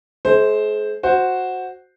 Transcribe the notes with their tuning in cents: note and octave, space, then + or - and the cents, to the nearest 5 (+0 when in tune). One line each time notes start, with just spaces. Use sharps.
G#3 +45 C5 +0
F#4 -5 C5 +0